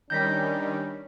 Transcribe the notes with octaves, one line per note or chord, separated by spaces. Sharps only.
D#3 G3 C#4 D4 G6 A#6 B6